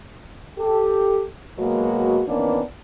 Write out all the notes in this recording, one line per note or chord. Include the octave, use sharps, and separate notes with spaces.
G4 A4
B2 F#3 G#3 A#3 F#4
D#3 E3 A#3 B3 C#4 D4